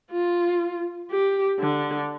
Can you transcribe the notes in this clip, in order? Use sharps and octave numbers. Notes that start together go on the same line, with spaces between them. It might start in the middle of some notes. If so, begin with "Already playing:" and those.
F4
G4
D3